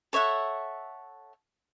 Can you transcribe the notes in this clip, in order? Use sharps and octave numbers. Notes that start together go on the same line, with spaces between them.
A4 C#5 E5 F#5